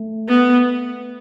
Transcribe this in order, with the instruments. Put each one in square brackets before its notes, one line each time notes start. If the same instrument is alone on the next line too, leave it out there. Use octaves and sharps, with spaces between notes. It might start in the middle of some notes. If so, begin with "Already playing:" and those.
Already playing: [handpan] A3
[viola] B3